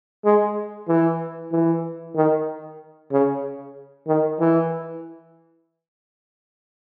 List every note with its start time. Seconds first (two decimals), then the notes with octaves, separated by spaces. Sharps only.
0.25 G#3
0.88 E3
1.53 E3
2.16 D#3
3.12 C#3
4.07 D#3
4.40 E3